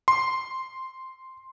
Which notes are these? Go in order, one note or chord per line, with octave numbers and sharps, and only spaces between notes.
C6